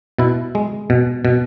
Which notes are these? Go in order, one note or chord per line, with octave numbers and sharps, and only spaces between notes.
B2 E4
G#3
B2
B2